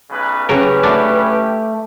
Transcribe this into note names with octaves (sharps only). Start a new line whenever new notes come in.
B1 C#3 B4
A2 C#3 F#3 C#4 G4 A#4 B4
A3 D4 F#4